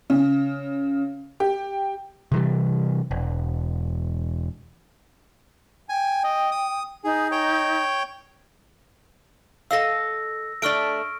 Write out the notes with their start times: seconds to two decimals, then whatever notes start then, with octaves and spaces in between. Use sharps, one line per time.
0.10 C#3
1.40 G4
2.32 C3 E3 G3
3.11 E1
5.89 G5 G#5
6.24 D#5
6.51 D#6
7.04 D#4 G#4
7.32 C#5 G5
9.71 A4 D#5 F5 E6 A#6
10.62 A3 D4 D5 C#6 F6 D7